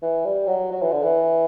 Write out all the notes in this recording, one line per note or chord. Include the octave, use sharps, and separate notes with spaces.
E3
G3
F#3
F#3
E3
D3
E3